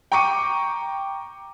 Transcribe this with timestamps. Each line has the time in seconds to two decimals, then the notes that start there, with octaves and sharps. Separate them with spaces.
0.12 G5 A#5 C#6 D6 C#7 D#7